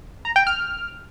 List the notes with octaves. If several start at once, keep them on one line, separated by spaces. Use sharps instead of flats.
A#5
G5
F6